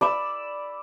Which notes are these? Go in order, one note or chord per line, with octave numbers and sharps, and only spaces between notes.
D5 B5 E6